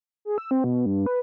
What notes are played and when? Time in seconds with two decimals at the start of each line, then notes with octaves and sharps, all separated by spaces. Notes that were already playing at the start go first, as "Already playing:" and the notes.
0.25 G#4
0.38 E6
0.51 C4
0.64 B2
0.86 G2
1.06 B4